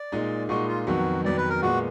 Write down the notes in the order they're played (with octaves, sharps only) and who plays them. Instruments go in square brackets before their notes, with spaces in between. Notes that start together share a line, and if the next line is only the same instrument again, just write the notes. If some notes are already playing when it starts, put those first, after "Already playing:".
Already playing: [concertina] D5
[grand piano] A#2 G#3 D#4
[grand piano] A#2 G#3 D#4 [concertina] F#4
[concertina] F4
[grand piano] F2 D#3 F#3 B3 [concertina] F#4
[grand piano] F2 D#3 F#3 B3 [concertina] D5
[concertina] B4
A#4
[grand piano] A#2 G#3 B3 [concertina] F#4